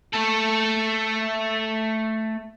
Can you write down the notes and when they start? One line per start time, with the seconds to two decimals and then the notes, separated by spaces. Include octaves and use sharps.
0.14 A3 A4